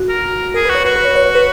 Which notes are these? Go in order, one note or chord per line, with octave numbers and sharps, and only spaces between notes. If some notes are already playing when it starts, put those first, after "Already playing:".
Already playing: F#4
A#4
G#4 A#4
B4
F#4
C#5
F#4 B4
B4
C#5
C#5
C#5
B4